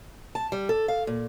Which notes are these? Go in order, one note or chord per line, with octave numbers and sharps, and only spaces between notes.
A5
G3
A4
F5
A#2